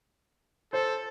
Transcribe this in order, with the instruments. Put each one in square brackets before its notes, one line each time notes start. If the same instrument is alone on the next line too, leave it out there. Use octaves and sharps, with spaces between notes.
[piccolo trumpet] A4 [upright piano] C5